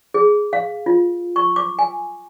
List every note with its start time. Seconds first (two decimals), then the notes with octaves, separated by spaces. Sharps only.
0.14 G#4
0.53 F5
0.86 F4
1.36 C#6
1.56 D6
1.79 G#5